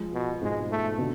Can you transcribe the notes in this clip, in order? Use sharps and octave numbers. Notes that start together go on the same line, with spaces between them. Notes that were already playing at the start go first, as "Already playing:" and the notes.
Already playing: F3 G#3
B2
G#2 B2 G#3
A3
B2 D3